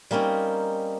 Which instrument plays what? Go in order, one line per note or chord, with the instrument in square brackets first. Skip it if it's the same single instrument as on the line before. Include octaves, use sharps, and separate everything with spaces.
[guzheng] G3 A#3 C4 C#4 D#4